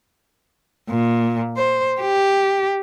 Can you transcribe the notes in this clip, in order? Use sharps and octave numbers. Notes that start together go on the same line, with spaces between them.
A#2
C5
G4